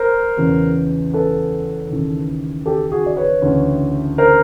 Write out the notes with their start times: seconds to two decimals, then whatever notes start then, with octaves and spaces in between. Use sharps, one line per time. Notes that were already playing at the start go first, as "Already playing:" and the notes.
Already playing: A#4 C5
0.37 E2 C#3 E3
1.14 A4 B4
1.90 D#2 C#3 E3
2.66 G4 A4
2.91 F#4 G#4
3.06 D5
3.17 B4 C#5
3.42 D2 C#3 E3
4.18 A#4 C5